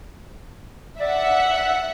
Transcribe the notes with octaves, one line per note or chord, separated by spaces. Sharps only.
D5 E5 F#5